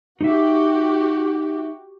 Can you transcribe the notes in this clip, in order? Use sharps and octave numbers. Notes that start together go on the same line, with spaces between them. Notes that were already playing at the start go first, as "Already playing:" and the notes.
D#4 F#4 G4 E5